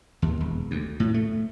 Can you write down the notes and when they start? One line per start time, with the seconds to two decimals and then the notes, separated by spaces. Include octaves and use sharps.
0.22 D#2
0.40 E1
0.71 D2
1.00 A2
1.14 A3